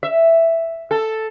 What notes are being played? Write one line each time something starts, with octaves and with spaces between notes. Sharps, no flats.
E5
A4